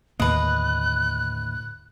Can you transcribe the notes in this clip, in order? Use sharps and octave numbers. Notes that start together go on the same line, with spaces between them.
D#2 A2 D3 A#3 B4 D#5 F#6